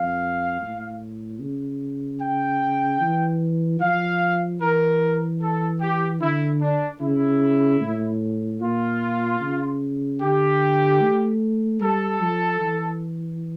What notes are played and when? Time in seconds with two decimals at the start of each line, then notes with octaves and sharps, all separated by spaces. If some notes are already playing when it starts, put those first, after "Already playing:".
Already playing: F2 F5
0.61 A2
1.41 C#3
2.21 G5
3.01 E3
3.80 F3 F5
4.60 E3 A#4
5.41 A4
5.80 G4
6.21 D3 E4
6.61 D4
7.01 C#3 E4
7.81 A2
8.61 A#2 F4
9.40 C#3
10.21 D3 G4
11.01 A3
11.81 G3 A4
12.21 F3
12.61 E3